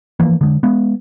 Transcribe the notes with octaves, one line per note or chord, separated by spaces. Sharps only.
E3 F3 A#3
D3 G#3
G#3 B3